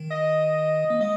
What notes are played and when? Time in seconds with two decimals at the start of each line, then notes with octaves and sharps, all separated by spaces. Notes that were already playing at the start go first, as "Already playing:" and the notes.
Already playing: D#3
0.10 D#5
0.90 A#3
1.00 G#3 D#5